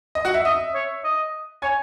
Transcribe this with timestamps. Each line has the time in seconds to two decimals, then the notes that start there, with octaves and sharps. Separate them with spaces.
0.15 D#5
0.25 F#4 F#5
0.34 E5
0.44 D#5 E5
0.74 C#5
1.04 D#5
1.62 C#5 G#5 G#6